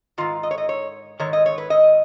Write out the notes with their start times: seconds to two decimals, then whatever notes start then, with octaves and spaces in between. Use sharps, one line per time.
0.18 G#2 D#3 F4
0.43 D#5
0.51 C#5
0.58 D#5
0.69 C#5
1.19 G#2 D#3 C#5
1.33 D#5
1.46 C#5
1.58 B4
1.70 D#5